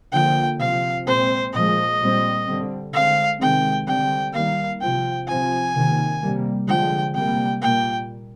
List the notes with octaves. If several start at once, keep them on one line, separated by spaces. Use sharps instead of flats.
D3 F3 A#3 G5
C3 F3 C4 F5
A#2 G#3 C4 C5
A#2 F3 G#3 D#5
A#2 G3 C4
D3 G3 C4
D3 G#3 C4 F5
C3 D#3 G#3 C4 G5
D3 G3 C4 G5
D#3 G3 A#3 F5
C3 F3 C4 G5
C3 F3 C4 G#5
C3 D#3 A#3
C3 G3 A#3
D3 F3 G#3 G5
C3 G3 A#3 G5
A#2 G3 A#3 G5